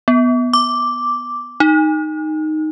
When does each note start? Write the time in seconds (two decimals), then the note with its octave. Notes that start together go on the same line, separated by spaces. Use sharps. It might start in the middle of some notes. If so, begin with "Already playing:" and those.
0.08 B3
0.53 D6
1.60 D#4